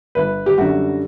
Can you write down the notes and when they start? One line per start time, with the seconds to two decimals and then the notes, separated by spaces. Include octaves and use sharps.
0.15 G1 B4
0.46 G4
0.58 F#2 D3 G3 F#4